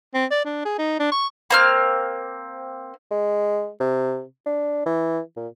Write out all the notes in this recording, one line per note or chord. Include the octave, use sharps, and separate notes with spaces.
C4
D5
D4
G#4
D#4
D4
C#6
A#3 C4 F6
G#3
C3
D4
E3
A#2